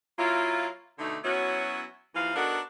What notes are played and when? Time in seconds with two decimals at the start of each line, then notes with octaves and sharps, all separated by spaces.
0.18 F#3 A#3 E4 F4
0.99 B2 D3 A3 D#4
1.23 F#3 B3 C#4 E4 F#4
2.15 D#2 E3 F3 F5
2.35 B3 D4 D#4 F#4 A4 A#4